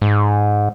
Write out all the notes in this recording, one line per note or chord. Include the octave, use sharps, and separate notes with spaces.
G#2